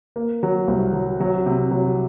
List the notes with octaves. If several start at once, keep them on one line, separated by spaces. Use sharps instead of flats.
A#3
F#3
C2
F#3
F#3
C3
F#3